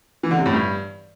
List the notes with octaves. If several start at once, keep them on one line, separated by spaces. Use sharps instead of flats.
E3
D3
C3
A2
G2